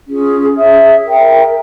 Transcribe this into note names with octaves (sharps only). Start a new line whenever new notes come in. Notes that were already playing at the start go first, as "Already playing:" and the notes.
C#4 F4 G#4
G#4 C#5 E5
A#4 E5 G5